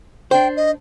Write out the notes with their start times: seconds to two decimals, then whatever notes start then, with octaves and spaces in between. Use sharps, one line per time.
0.31 D4 C5 G5
0.57 D#5